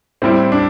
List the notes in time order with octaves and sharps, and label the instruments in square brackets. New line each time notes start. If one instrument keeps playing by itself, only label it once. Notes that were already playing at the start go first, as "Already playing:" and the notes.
[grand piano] A2 G3 E4 [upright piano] C4
[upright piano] D4